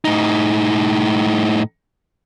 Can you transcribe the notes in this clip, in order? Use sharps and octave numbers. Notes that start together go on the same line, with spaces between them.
A2 D#4